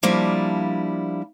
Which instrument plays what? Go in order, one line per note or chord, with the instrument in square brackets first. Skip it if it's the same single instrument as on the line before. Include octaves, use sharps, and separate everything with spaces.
[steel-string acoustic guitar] F3 G3 A#3 D4 E4